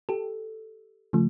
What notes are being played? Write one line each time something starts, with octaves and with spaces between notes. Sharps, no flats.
G4 A4
C#3 F3 A3